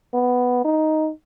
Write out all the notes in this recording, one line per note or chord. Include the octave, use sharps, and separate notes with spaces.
B3
D#4